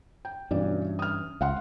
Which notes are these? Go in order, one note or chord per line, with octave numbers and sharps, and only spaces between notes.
G5
B1 G2 E3 C#4 D4 D5
D#6 F6
C#2 F5 F#5 C6